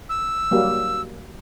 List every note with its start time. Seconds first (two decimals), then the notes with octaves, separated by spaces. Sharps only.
0.09 E6
0.51 F#3 G3 A#3